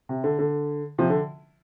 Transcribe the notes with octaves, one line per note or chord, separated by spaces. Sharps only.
C3
D3
D3
C3 F3
D3